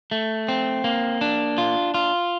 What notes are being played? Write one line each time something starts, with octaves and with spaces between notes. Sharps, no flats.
A3
C4
A#3
D4
F4
F4